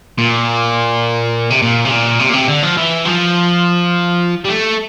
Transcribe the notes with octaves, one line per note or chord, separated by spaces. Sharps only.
A#2
C3
A#2
C3
A#2
C3
A#2
C3
D3
F3
E3
F3
G3
A3